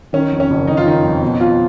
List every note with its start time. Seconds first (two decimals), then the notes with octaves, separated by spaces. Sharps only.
0.13 D#3 C#4
0.32 F2
0.40 C#4
0.50 F#1
0.67 D#3 D#4
0.77 F4
0.86 D#3 D#4
1.04 F2
1.22 B2
1.40 F4